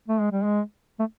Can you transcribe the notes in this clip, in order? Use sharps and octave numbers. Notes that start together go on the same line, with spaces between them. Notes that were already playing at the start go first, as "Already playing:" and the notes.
A3
G#3
G3
G#3
A3